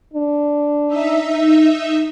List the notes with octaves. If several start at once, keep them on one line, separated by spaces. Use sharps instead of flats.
D4
D#4 E5